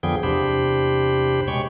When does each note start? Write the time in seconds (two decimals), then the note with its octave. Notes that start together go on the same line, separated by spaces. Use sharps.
0.03 F2 D3 F3 B3 G#4 G5
0.23 E2 C3 D4 G4 C5 B5
1.48 B2 G#3 C#5 G5 C#6